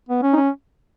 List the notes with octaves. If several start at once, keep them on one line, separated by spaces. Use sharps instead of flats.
B3
C#4
D#4
C#4